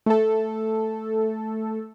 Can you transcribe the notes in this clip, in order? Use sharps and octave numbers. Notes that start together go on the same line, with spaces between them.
A3 A4